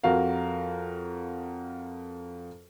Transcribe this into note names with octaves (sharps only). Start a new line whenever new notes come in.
F2 F#4 A#4 F5